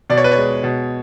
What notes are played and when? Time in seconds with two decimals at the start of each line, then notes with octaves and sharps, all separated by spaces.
0.10 B2 D5
0.17 C#5
0.24 B4
0.32 C#5
0.37 G#3
0.64 B2